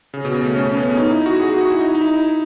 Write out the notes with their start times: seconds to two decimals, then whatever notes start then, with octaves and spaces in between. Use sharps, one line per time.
0.14 C#3
0.25 B2
0.34 C#3
0.45 A3
0.56 C#4
0.72 C#4
0.77 B3
0.91 C#4
0.97 D#4
1.11 E4
1.26 F#4
1.40 G#4
1.50 F#4
1.60 F#4
1.70 E4
1.81 D#4
1.95 D#4
2.01 E4